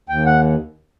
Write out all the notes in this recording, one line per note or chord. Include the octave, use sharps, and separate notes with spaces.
D#2 G5
F#5